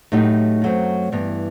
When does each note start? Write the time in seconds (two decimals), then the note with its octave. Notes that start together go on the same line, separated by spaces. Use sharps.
0.12 A2 F#3 A3 D#4 G4
0.62 F#2 F#3 A3 C4
1.12 G2 E3 B3